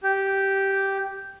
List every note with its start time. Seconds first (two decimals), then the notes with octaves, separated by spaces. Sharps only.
0.03 G4